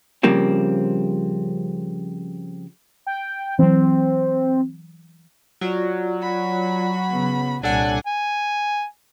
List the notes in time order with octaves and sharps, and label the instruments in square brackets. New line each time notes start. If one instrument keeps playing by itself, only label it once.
[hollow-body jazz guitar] C#3 F3 G3 A#3 C4
[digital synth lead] G5
[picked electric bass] E3 F#3 [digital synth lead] C4
[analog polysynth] F#3 [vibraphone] F4 D5
[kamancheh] F#4 B5
[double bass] C#3 B3
[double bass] C2 A#2 [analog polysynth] D4 A4 F#5 [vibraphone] C#5 [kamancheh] G#5
[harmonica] G#5